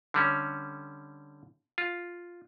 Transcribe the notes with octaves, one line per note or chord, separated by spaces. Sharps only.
D3 G3 C#4
F4